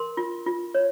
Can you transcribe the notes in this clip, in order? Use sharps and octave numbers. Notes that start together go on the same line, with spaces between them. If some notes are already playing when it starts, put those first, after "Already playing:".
Already playing: A#4 C6
F4
F4
C#5